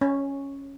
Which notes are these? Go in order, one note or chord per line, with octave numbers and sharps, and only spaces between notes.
C#4